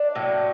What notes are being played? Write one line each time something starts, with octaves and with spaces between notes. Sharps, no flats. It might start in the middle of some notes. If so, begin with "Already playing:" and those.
Already playing: D4
A2 F#3 A#3